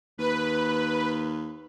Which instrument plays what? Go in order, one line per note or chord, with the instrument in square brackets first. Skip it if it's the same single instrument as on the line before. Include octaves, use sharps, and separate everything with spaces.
[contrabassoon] D#2 [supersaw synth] B4